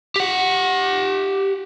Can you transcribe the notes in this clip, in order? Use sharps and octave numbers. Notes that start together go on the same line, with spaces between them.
G4 F#5